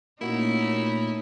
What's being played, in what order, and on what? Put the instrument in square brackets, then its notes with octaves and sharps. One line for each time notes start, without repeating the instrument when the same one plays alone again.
[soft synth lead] A#2 [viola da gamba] A3 C#4 D#4 [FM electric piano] A#3 F#4 [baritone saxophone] E4